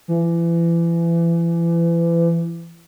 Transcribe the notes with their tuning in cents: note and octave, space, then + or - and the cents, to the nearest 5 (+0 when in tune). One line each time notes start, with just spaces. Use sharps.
E3 +35